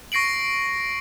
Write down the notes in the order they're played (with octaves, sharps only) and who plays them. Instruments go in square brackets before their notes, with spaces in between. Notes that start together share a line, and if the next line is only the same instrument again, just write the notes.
[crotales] C#6 A#6 C7 D7 F#7